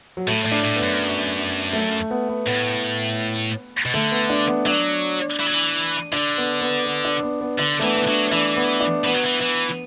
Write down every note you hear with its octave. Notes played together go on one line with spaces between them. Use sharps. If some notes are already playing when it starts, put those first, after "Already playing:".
F#3
A2 A3
A2
D4
A2
B3
F#2
A3
B3
B3
A2 B3
B2
D3 A3
B3
D4
B3
F#3 D4
E3
F#3
E3
D3 D4
B3
B3
B3
D4
B3
B3
D3 D4
A3
E3 B3
B3
F#3 D4
E3 D4
B3
D4
E3 B3
F#3
E3
E3